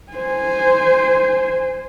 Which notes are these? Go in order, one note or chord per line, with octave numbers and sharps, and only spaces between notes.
C5 G#5